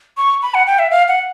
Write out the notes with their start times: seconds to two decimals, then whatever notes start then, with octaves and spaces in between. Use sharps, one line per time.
0.17 C#6
0.42 B5
0.54 F#5
0.67 G5
0.79 E5
0.91 F5
1.08 F#5